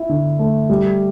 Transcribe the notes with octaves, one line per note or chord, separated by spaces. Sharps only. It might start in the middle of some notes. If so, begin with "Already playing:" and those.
Already playing: E4
D3
A3
G3